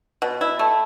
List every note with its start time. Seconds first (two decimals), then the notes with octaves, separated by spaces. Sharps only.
0.22 B2
0.41 E4
0.59 A3